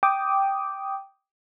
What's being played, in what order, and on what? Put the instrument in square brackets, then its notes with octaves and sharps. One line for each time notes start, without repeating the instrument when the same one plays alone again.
[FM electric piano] G5 D6 D#6